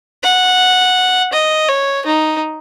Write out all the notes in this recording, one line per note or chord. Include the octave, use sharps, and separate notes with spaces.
F#5
D#5
C#5
D#4